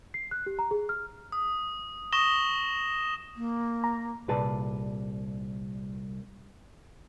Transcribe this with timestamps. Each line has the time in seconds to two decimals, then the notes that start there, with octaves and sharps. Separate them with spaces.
0.14 C7
0.31 F#6
0.46 G4
0.59 A#5
0.71 G#4
0.89 F6
1.32 D#6
2.12 C#6 D#6 A#6 E7 G7
3.36 A#3
3.84 A#5
4.28 C2 A#2 G#4 B4 D5 A5